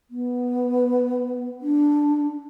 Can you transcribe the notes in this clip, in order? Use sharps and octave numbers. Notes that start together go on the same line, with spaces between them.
B3
D4